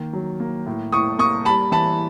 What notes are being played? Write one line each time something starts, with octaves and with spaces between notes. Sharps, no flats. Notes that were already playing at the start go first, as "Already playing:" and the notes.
Already playing: D#3 A#3
F#3
A#3
A2
A2 C#6 D#6
A#3 C#6 D#6
G3 A5 B5
E3 A5 B5